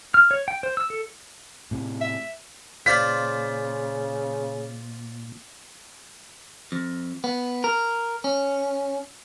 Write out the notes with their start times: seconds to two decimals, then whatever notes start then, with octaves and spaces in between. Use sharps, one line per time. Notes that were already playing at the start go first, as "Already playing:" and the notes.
0.14 F6
0.31 C#5
0.48 G5
0.63 C5
0.77 E6
0.90 A4
1.71 A2 C3
2.01 E5
2.86 A#2 C#3 F4 C5 D5 B6
6.72 F2
7.24 B3
7.64 A#4
8.24 C#4